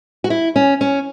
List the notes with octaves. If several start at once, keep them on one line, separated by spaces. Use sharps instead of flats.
F#4
E4
C#4
C#4